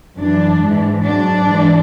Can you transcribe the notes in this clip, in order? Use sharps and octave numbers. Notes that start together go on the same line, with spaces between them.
F#2 E3 D4
G#2 E3
G#2 F#3 D4
G#2 E3